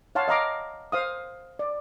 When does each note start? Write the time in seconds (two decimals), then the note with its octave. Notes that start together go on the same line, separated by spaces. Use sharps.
0.15 C#5 F5 F#5 A5 C6
0.28 D#5 F5 A#5 D6
0.92 C5 F5 D#6
1.59 D5